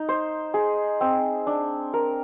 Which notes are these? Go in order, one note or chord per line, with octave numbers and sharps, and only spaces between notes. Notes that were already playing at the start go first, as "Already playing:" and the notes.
Already playing: D#4
C5
G#4
C4
D4
A#4